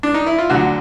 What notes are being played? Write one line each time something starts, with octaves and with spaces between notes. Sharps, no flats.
D4
D#4
E4
F4
D2 D3 F#3 F#4